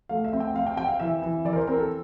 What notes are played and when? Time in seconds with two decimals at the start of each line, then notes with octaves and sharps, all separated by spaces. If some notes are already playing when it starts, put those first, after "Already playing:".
0.09 A3 F5
0.24 E5
0.33 C4
0.40 G5
0.54 C4 F5
0.67 G5
0.77 C4 G5
0.89 F5
1.00 E3 E5
1.22 E3
1.45 E3 D5
1.53 A#4
1.56 C5
1.67 C4 A#4
1.78 A4